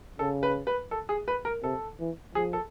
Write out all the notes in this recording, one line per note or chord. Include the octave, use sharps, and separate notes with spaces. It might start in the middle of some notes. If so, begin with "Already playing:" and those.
C#3 A4
B4
B4
A4
G#4
B4
A#4
C3 A4
E3
F3 G#4
A4